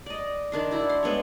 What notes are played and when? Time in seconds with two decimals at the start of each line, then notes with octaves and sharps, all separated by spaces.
0.06 D5 D#5
0.52 D#3 D4 C6
0.71 E4 F#4 D5
0.89 C6
1.03 G#3 B3 D4 C#5